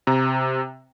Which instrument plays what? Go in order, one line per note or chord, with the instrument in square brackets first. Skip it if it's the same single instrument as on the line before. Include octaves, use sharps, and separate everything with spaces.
[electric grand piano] C3 A#5